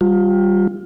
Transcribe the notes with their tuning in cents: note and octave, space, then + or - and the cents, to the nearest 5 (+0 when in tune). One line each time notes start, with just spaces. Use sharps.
G3 +0 F4 +25